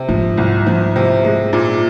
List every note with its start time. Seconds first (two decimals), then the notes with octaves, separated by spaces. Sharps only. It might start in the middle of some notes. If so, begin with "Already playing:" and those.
Already playing: C3
0.09 G#2 F3
0.37 C2
0.67 F3
0.96 C3
1.25 G#3
1.53 A#2